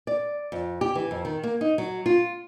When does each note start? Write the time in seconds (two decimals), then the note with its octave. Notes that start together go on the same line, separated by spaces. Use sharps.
0.07 D5
0.52 F2
0.81 G4
0.95 E3
1.11 F2
1.25 D#3
1.43 A#3
1.61 D#4
1.78 F#3
2.06 F4